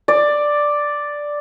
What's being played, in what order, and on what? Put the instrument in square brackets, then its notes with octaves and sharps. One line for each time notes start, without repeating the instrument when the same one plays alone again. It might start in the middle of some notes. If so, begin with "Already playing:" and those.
[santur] D5